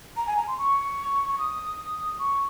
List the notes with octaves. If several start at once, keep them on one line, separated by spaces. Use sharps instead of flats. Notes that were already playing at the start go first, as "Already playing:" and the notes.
A#5
G#5
A#5
C6
C#6
C#6
D#6
C#6